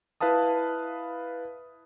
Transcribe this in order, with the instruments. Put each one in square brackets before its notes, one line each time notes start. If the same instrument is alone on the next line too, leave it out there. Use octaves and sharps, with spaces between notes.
[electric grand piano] E4 B4 F5 A5 D#6